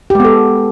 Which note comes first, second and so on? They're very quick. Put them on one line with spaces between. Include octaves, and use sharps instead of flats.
G4 G#3 B3 A4